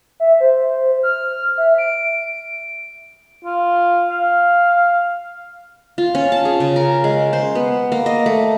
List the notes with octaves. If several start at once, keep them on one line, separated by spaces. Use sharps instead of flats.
E5
C5
F6
E5
D7
F4
F5
F4
C#4
A5
G#4
C#3
A#4
G#3
C5
B3
A#3
D#5
A3